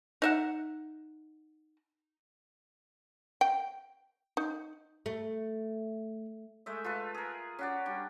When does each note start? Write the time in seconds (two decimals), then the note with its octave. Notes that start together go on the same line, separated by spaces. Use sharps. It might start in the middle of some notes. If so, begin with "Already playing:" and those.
0.22 D#4 E5 F#5
3.41 G5
4.37 D#4
5.06 A3
6.66 G#3 A3 E5
6.84 F4 A4 B4
7.15 G#4 A#4
7.59 C#4 F#4 D5
7.86 G3 D4